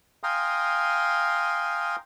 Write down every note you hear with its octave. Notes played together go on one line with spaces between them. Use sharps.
F5 G5 G#5 A#5 C6 D#6